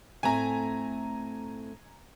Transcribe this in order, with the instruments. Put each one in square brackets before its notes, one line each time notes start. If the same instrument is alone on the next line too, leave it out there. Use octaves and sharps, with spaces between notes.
[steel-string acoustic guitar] A2 A3 C4 [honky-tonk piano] G#5 A#5